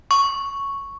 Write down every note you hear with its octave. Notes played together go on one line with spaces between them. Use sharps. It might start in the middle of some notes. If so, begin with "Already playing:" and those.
C#6